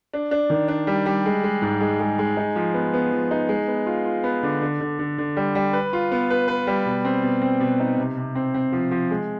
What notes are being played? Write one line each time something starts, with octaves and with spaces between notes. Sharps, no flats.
D4
D4
D#3
D4
G3
G3
G#3
G#3
G#2
G#3
G#3
G#3
D#4
F3
B3
B3
F3
D#4
G#3
B3
F4
F4
B3
D3
D3
D3
D3
D3
G3
G3
B4
F4
B3
B4
B4
G3
B2
C4
B2
C4
B2
D#4
C3
C3
C4
C4
F3
F3
G#3